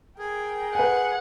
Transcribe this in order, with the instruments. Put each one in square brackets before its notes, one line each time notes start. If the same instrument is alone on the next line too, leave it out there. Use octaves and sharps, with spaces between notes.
[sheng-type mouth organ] G#4 [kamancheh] A#4 G5
[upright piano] B4 G#5 [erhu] F#5